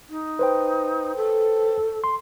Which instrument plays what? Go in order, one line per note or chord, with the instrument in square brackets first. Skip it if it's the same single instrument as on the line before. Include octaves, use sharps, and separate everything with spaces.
[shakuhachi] D#4
[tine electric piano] B4 C5 G5
[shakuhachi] A4
[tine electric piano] C6